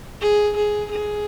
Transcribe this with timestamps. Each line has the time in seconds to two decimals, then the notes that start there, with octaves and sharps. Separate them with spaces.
0.21 G#4
0.56 G#4
0.90 G#4